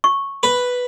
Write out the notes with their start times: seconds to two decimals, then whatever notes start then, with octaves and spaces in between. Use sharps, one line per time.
0.04 C#6
0.43 B4